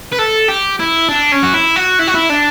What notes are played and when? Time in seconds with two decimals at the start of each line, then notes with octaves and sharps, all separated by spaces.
0.12 B4
0.19 A4
0.48 G4
0.79 E4
1.09 D4
1.32 C#4
1.43 F#4
1.54 E4
1.76 F#4
1.99 E4
2.07 F#4
2.14 E4
2.29 D4